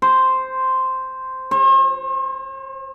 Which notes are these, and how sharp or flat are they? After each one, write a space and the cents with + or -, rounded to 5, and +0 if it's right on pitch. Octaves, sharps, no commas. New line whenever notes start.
C5 -5
C5 +45